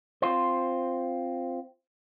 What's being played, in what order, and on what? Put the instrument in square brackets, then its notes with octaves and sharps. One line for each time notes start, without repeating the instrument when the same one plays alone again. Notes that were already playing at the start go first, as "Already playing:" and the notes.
[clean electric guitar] C4 F4 C5